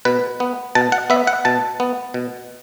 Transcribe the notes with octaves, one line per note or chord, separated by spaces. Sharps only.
B2 B4
B3
B2 A5
F#5
B3 E5
F#5
B2 A5
B3
B2